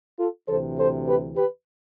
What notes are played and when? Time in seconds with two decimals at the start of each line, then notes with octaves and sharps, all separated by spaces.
0.19 F4 A4
0.48 D2 C3 E3 A4 C5
0.78 A4 C5
1.06 G4 B4
1.35 G4 B4